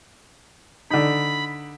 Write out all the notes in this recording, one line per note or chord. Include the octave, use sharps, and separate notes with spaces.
D3 D#4 B5